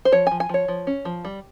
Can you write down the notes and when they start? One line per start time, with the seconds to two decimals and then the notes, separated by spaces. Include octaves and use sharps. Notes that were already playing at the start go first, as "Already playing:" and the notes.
0.05 C5
0.12 F3 C#5
0.27 G#5
0.31 F3
0.40 G#5
0.49 F3 C#5
0.68 F3
0.87 C#4
1.05 F3
1.25 G3